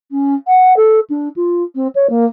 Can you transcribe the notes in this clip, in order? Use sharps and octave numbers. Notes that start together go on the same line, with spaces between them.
C#4
F#5
A4
D4
F4
C4
C#5
A#3